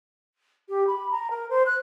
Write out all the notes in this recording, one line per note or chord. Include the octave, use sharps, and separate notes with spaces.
G4
B5
A#5
A#4
C5
F#6